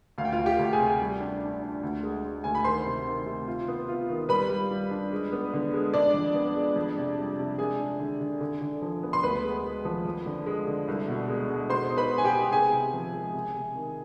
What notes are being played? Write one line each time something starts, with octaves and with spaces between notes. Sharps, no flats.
D2 F5
G5
F4 F5
D2
G4 G5
D2
G#4 G#5
C3
G3
D4
D4
D4
D2
G#3
G#3
D2 G#5
B5
D#3 C5 C6
C3
D#3
C3
F4
B3
F4
D#3
G3 B4 B5
G3
G3
D4
G#3
B3
D3
G#3
G#3 D4 D5
F2
B3
G#3
F2
C3
G3
C3
G#3 G#4 G#5
D4
D3
D3
D3
D3
F3
B3
C6
D2 B4 B5
G#3
G#3
F3
F2
D3
G#3
D3
C2
B2
G#3
G#3
B2 C5 C6
D#4
B4 B5
D#4
G#5
G4 G5
B3
C3 G#4 G#5
C3
F3
G#3
C3
C3
D#3